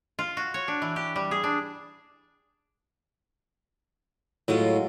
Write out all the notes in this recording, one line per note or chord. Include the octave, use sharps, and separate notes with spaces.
F4
F#4
C#5
D4
E3
G4
G3
G#4
D4
A2 F#3 G#3 F4